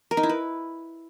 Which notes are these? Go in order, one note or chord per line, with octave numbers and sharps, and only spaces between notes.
A#4
D#4
E4
B4